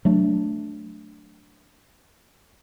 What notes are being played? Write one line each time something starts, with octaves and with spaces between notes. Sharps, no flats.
F#3 A3 D4